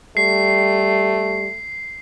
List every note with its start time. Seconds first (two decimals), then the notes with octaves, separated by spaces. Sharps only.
0.17 G3 A3 C7